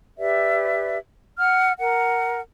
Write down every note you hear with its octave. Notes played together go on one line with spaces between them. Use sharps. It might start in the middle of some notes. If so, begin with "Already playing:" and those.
G4 B4 D5 E5
F#5 F6
A#4 F#5